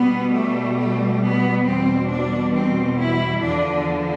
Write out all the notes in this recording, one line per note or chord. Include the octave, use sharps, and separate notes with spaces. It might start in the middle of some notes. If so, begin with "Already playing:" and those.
Already playing: B2 G3 B3
A3
A3
B3
E2 B2 G3 C4
D4
C4
E4
E2 D3 F3 D4